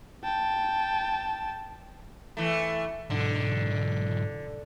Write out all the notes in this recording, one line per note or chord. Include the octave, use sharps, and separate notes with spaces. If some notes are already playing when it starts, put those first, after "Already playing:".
G5 A5
E3 A3
B1 G#2 D3